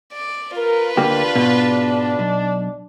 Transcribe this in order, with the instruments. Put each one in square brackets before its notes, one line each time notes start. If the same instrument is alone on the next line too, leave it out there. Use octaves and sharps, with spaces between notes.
[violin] D5
[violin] F4 B4 [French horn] A#4
[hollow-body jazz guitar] D2 A#3 G4 [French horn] D4
[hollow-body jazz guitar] G#2 B2
B1